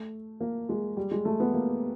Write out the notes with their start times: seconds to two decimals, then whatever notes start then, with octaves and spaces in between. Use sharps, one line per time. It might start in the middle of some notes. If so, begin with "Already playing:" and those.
Already playing: A3
0.40 A#3
0.69 G#3
0.97 G3
1.11 G#3
1.25 A3
1.40 B3
1.54 A#3